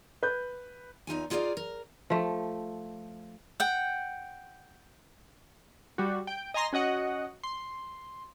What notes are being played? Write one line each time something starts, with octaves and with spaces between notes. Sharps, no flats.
B4 G6
E2 D#4 F4 G#5
D#4 F4 G#4 C#5 D5 F5
A#4
F3 A3
F#5 G5
G3 F#4
G5
D#5 G#5 A#5 C6 A#6
C#4 F#4 D#5 F#5
C6